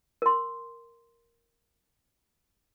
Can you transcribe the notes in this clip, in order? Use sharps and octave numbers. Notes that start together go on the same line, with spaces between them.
A#4 C6